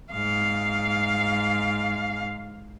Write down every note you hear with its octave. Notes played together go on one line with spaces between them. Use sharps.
G#2 F5